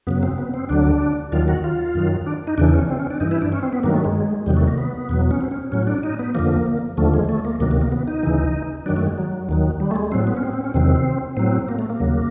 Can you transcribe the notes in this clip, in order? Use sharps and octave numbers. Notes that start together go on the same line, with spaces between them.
F#2 C#3 F#3 B3
C4
B3
C4
D2 D3 F#3 D4
D#2 D#3 F#3 F4
F#4
F4
F#2 D#3 F#3
D4
D#4
E2 C#3 E3 D4
C#4
C4
C#4
D4
G2 E3 D#4
E4
D4
C#4
C4
B3
G2 D#3 F#3 A#3
A3
G#3
E2 C3 D#3 F#3 G3
A3
A#3
B3
E2 B2 F#3
C#4
C4
C#4
A2 F#3 C#4
D4
D#4
B3
F2 D3 F3 A#3
D#2 D3 F3 A3
G#3
A3
A#3
D2 C3 D#3 F#3 A#3
A#3
A#3
B3
D#4
D2 C#3 E3
F#2 D#3 F#3 D4
A3
G#3
F#3
D#2 D#3 F#3
G3
A3
G#3
A2 F#3 C4
B3
C#4
C4
C4
C#4
E2 C3 D#3 F#3 C4
A2 F#3 C4
A#3
A3
A#3
D#2 C#3 F#3